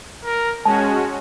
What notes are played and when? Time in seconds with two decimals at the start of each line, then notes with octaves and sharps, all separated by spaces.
0.25 A#4
0.65 G#3 C#4 F#4 G#5 A5